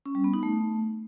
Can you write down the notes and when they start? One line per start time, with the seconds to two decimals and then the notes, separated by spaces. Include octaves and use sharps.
0.06 C#4
0.15 G3
0.24 B3
0.34 D#4
0.43 A3